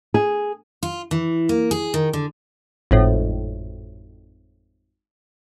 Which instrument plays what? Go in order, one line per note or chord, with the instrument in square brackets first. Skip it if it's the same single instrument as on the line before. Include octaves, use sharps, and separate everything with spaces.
[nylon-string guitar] G#4
[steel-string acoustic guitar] F4
E3
A#3
G#4
D#3
D3
[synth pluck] G#1 F2 A2